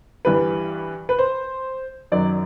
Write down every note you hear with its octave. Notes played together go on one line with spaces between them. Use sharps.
G2 E3 G3 B4
B4
C5
F#2 D#3 F#3 D5